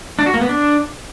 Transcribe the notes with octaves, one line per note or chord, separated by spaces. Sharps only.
D4
F#4
A#3
B3
D4